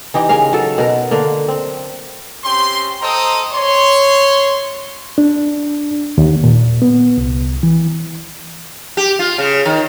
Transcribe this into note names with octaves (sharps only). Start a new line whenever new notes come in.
E3 D#4 G4
C#3 C#4 A#4 F5
F#3 A4
B2 A#4
D3 A#3
C4
C4 C#4 G4 C6
A4 C5 D#5 G5 A#5 D#6
C#5 C6
D4
D#2
A#2
B3
C2
E3
G4
F4
C#3
D#3